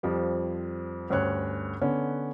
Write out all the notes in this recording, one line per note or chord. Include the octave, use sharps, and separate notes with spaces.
F2 F3 G3
D2 G2 C#4 C5 C#5 F#6
D3 B3 C#4